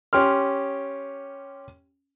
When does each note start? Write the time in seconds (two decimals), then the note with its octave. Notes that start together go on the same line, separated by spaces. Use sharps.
0.13 C#4 G4 C6 F6